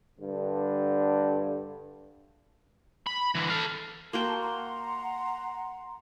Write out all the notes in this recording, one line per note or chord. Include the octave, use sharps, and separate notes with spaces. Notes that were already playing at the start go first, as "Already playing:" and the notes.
G2 D3
B5
D3 E3
A4 F5
A#3 F#4 G5 A5 C6
F#5 A#5 C6